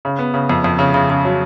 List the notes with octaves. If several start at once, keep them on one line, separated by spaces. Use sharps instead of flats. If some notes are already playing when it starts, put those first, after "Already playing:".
C#3
B3
C#3
F2
F2
C#3
C#3
C#3
F#3